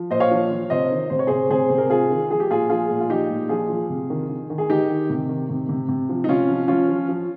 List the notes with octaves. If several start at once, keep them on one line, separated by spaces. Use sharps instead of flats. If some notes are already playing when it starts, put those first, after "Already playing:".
Already playing: F3
A#2 C5 D#5
C#5 F5
F3
F3
C3 C5 D#5
D#3
C3 C5
C#5
C3 G#4 C5
C3 G#4 C5
C3
A#4
C3 F4 G#4
D#3
F3 G#4
G4
A#2 F4 G#4
F3 F4 G#4
A#2
F4
F3 D#4 G4
A#2
F3 F4 G#4
F3
C3
D#3
D#3
D#3
G#4
D#3 D#4 G4
D#3
C3
D#3
C3
C3
C3
F3
D#4
C3 C#4 F4
F3
F3 C#4 F4
F3
F3